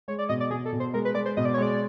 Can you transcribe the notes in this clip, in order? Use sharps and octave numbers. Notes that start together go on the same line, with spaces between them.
G#3 C#5
D5
B2 D#5
D5
B2 G#4
A4
B2
C5
G#3 A#4
B4
G#3 D5
C5
B2 D#5
D5
C#5
G#3 D5